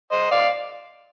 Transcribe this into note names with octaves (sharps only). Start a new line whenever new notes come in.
C5 D#5
D5 F5